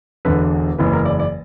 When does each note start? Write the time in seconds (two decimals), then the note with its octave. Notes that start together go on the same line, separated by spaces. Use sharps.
0.25 E1 E2 D3 B4
0.78 F#1 E2 C#3 E3 B4
0.93 A#4
1.05 D5
1.19 D5